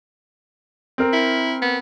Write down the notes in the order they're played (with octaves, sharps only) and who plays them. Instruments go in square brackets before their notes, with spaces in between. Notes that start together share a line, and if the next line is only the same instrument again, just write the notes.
[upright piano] C4 A#4
[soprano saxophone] E4
B3